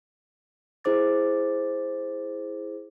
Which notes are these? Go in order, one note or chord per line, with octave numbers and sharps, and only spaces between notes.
E4 G#4 C5 D6 A6